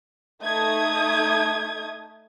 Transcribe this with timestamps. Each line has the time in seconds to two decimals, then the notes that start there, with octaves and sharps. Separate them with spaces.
0.42 A3 D#4 D#6 G#6